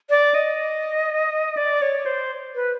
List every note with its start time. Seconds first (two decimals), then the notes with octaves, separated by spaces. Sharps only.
0.10 D5
0.34 D#5
1.57 D5
1.82 C#5
2.06 C5
2.55 B4